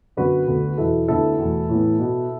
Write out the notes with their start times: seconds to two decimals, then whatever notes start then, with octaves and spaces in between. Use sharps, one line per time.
0.17 F#2 D3 B3 F#4 B4
0.47 D2 D3 B3
0.78 E2 B2 F#3 E4 A4
1.08 D2 D3 B3 E4 A4
1.38 E2 B2 A3
1.69 A2 E3 B3
1.99 B2 B3